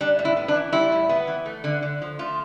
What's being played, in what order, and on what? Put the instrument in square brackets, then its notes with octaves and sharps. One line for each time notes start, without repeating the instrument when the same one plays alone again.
[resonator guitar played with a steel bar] G3 D4
A2
E4
B3
D4
E3
G3 E4
A2
B3
E3
A3
D3
D3
F3
A3 F4